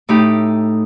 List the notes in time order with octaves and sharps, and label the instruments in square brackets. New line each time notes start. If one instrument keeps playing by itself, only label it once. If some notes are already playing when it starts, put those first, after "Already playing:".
[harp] A2 D#4 G4